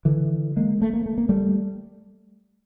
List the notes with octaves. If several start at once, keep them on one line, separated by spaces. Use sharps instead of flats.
D3 E3
G#3 A#3
A3
A#3
A3
A#3
G3 A3